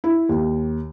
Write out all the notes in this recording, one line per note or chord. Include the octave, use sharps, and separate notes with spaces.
E4
D#2